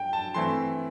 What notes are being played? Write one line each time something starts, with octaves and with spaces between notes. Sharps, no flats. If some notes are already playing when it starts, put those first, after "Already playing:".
Already playing: G5
A5
E3 A3 C4 E4 C6